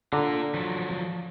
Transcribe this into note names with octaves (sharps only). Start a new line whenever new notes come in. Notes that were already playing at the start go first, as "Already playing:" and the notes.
D3 F4 A#5
F3 F#3